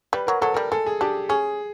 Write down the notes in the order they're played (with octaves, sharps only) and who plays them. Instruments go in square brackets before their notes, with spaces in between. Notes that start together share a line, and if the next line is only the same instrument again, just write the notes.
[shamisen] G3 [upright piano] B4
[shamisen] F#3 [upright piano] A#4
[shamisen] F#3 [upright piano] A4
[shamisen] G3 [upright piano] A#4
[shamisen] G#3 [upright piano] A4
[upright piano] G#4
[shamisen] D4 [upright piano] G4
[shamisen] C#4 [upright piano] G#4